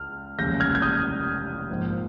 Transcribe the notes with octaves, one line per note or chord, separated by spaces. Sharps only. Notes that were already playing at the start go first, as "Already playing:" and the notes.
Already playing: C#2 F6
F1 D#2 C#3 G#3 G6 A#6
F6 G#6
G#6
D#6 G6
A#1 G#2 F3 A#3